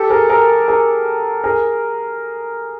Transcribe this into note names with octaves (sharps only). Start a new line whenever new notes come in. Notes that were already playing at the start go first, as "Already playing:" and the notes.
Already playing: G4 A4
G#4 A#4
G#4 A#4
G#4 A#4
G#4 A#4